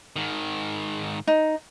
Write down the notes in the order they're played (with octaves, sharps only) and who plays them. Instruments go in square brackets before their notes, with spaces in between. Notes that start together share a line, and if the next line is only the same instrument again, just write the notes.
[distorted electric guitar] G#2 D#3
[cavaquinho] D#4